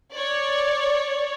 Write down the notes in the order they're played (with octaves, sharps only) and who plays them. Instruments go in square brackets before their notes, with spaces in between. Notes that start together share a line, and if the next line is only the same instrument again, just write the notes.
[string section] C#5 D5